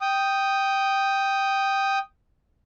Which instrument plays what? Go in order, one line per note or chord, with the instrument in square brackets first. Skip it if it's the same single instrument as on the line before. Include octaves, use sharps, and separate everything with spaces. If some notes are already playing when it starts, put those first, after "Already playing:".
[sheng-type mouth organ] G5 D#6